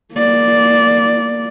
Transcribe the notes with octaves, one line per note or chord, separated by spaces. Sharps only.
A#3 D5